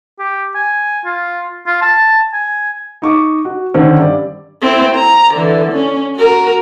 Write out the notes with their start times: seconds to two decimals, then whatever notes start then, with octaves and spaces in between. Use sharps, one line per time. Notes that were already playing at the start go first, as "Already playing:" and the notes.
0.18 G4
0.55 G#5
1.05 F4
1.67 F4
1.81 A5
2.33 G#5
3.02 D#4 C#6 D6
3.45 F#4
3.74 D3 D#3 C4 C#4
3.99 G2 D5
4.62 C4 E4
4.95 A#5
5.35 D3 E3
5.72 C#4
6.16 F#4 A#4